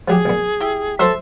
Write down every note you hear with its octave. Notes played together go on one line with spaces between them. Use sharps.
F3 F#3 G4 G#4
B1 A#2
E4 G4
F#3 A4 C5 E5